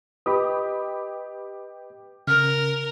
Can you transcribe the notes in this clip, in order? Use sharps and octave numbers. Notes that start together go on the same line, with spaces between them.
G4 B4 D#5 B5 D#6
C#3 A#4 F6